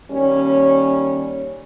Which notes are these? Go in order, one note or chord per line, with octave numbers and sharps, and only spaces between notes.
D#2 G3 C#4